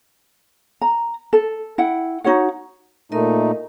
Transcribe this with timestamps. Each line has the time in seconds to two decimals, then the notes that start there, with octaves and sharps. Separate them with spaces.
0.81 A#5
1.33 A4
1.78 E4 F#5 G5
2.24 D#4 F#4 C#5 F#5
3.12 A#2 A3 D#4 A#4 D#5